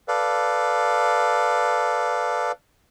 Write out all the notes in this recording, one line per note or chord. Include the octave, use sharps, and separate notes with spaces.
A4 B4 D5 F5